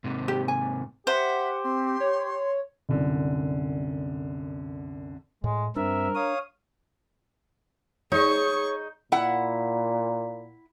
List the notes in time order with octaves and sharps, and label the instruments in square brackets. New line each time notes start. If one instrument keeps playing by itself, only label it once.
[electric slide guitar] G#2 C3
[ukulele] G4
G#5
[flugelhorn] G4 [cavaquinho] C5 [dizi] E5 [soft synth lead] F#5
[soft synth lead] C4 [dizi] C6
[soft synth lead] C#5
[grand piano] C2 F#2 D3
[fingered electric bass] A2 [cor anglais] G#3
[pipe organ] G2 C4 E5 [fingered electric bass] D4 [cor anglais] A#4
[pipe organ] C#5 F5 D#6
[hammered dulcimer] D#4 [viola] G#4 C#6 [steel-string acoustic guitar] C#5
[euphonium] A#2 [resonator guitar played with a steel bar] E4 F#5